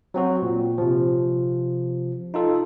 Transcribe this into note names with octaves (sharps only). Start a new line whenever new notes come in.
F#3 C4 F#4
A#2
C3 F3
D#4 F4 A4